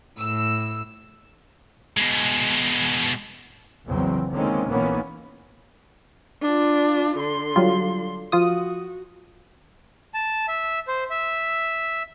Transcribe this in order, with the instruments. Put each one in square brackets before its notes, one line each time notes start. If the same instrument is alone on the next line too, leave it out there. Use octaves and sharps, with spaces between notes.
[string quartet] A2 [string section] E6
[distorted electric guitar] B2 G#3
[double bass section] A#1 E2 A#2 C#3 F#3 C4
D3 D#3 G#3 A#3 C4 C#4
A#1 D#3 E3 A#3 B3 C#4
[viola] D4 F4
D3 C6
[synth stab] F#3 G3 F4
[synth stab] F3 F4 D#6 [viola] F#4
[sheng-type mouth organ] A5
E5
C5
E5